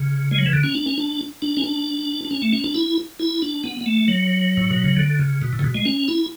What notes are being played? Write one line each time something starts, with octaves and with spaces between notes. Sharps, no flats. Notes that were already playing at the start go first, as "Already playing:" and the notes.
Already playing: C#3
G#3
F#3
E3
D3
C#4
D4
C#4
D4
D4
C#4
D4
D4
C#4
A3
C#4
D4
E4
E4
D4
B3
B3
A3
F#3
A2
B2
C#3
D3
C#3
B2
A2
C#3
B2
G#3
C#4
E4